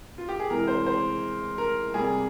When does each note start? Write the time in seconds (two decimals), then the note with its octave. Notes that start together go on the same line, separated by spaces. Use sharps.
0.18 F4
0.28 G4
0.39 G#4
0.50 C3 E3 G#3 A#4
0.67 C5
0.87 C5
1.58 A#4
1.94 C3 G3 A#3 G#4